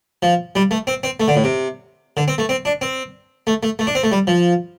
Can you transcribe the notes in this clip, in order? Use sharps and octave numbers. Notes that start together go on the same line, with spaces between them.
F3
G3
A3
C4
C4
A3
D3
A2
C3
D3
C4
A3
C4
D4
C4
A3
A3
A3
D4
C4
A3
G3
F3